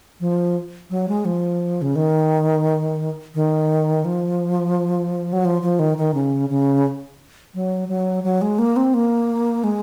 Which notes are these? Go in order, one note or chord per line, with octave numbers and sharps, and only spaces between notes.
F3
F#3
G#3
F3
C#3
D#3
D#3
F3
F#3
F3
F3
D#3
D#3
C#3
C#3
F#3
F#3
F#3
G#3
A#3
C4
A#3
G#3